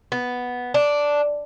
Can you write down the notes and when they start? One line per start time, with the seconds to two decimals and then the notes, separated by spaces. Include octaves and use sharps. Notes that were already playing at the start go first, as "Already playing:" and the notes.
0.12 B3
0.74 D4